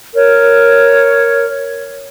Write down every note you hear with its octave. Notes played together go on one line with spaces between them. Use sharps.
A#4 C#5